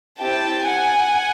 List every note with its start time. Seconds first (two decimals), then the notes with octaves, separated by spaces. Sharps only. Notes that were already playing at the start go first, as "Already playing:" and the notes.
0.20 C4 E4 G4 G5 A5
0.67 F#5 G#5